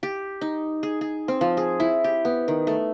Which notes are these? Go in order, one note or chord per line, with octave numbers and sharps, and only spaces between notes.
G4
D#4
G#4
G#4
C4
F3
G#4
E4
G4
B3
D#3
A3